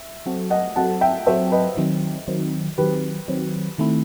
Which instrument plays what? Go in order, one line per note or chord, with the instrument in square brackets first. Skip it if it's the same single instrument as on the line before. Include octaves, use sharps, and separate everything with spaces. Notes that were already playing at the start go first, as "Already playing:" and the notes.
Already playing: [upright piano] E5
[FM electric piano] F#3 C4 F#4 A4
[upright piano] D#5 F#5
[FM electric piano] F#3 C4 F#4 A4 [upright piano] F#5 A5
[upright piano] E5 G5
[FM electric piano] F#3 C4 F#4 A4 [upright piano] C5 E5
[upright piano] B4 D#5
[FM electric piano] D#3 F#3 C4
D#3 F#3 C4
[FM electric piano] D#3 F#3 C4 [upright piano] G4 B4
[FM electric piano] D#3 F#3 C4
D#3 A3 C4 E4